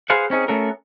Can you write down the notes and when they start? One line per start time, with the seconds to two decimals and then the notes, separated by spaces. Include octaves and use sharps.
0.10 G#4 B4 C5 F5 F#5
0.30 C4 C#4 D#4 G#4
0.48 A3 B3 C#4 F#4 A4 A#4